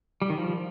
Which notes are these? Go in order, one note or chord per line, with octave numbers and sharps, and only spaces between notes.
G3
D#3
F3